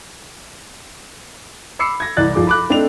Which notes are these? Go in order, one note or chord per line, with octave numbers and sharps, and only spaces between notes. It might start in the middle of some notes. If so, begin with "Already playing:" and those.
B5 D6 E6 C7 C#7
G#6 A#6
C2 E3 D5 F#6 A6
A#1 F3 G#4 D6
B5 D6 F#6
A3 C4 D4 A4 D#5 F7